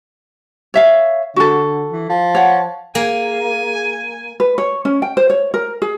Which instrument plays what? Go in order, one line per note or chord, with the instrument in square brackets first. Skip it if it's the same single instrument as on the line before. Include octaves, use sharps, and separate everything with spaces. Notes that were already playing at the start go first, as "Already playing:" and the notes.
[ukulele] C#5 E5 F5
[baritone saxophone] D3 [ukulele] F#4 A4
[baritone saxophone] E3
F3
[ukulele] C#5 F#5
[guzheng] A#3 [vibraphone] G#4 [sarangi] G#5
[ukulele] B4
C#5
C#4
G5
C5
C#5
A#4
G#4